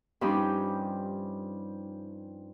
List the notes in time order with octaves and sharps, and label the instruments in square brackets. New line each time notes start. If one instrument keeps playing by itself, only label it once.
[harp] G2 F3 G3 C#4 D#4 G4